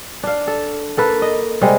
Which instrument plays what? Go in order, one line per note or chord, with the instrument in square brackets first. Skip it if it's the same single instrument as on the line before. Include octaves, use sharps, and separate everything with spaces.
[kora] D4 F5
A4
A#3 A4 B4
D#5
C3 G3 G#3